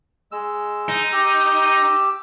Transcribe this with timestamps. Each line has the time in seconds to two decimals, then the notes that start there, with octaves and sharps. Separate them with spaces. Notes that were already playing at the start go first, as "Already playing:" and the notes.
0.32 G#3 E6
0.88 D#4
1.12 G4 E6